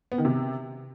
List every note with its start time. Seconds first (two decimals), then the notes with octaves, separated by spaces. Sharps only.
0.12 B3
0.18 D#3
0.25 C3